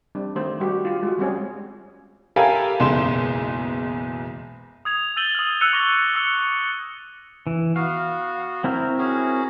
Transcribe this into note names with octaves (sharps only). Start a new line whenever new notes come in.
G3 C4 D4
D#3 A3 G4 C5
G3 F#4 G4
F4 G4
G#3 F#4
G3 C4 C#4 G#4
G4 A4 A#4 F5 G#5 B5
F#1 B1 E2 G#3 C6 E7
D#6 G#6 F7
E6 G6 A6 D#7 F#7 G7
D#6 F6
E6 F#6 C#7 D#7 F7 G7
C#6 D6 F6 A#6 G7
E6 C#7
E3
B3 F#4 F5
C4 E4 A#4
C#4 F#4 G#4